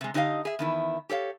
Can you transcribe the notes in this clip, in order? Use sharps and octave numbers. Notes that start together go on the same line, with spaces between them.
C3 G#3
D3 D#4 G4 C5 D#5 F5
G#4 E5
E2 D#3 E4
G4 A4 C#5 F5